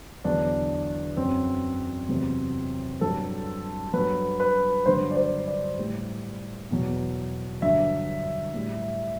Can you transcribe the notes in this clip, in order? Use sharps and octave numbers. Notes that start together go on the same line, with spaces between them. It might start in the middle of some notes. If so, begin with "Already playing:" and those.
E2 D3 F#3 D4
F#2 F#3 C4
E2 C3 F#3
G2 F#3 A4
G2 F#3 B4
B4
G2 D3 F#3 C5
D5
C5
D5
A2 G3
E2 B2 F#3
G2 D3 F#3 E5
A2 G3